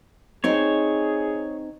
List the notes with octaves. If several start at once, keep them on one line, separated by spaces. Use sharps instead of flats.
C4 D#4 G#4 C5 C#5